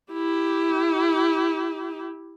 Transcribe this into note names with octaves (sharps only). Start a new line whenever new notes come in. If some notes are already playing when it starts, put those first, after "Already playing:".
E4 G4